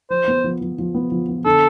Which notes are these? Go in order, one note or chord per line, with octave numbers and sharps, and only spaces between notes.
F3 C5
B3
F3
F3
F3
B3
F3
B3
D3 A4